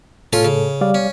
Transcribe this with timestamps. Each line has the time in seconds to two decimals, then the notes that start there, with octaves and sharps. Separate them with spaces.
0.33 A2 C#4 F4 A4 C6
0.45 C#3
0.81 G3 D5 F5
0.94 C#4